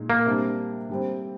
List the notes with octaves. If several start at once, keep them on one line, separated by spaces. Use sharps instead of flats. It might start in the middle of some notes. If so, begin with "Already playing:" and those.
Already playing: A#2 G#3 D#4
A#3
C3 G3 D4
D3 G3 C4